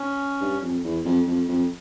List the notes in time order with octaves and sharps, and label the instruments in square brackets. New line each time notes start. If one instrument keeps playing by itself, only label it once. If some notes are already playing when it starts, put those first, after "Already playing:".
Already playing: [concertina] C#4
[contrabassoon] G2
F2
E2
F2
F2
F2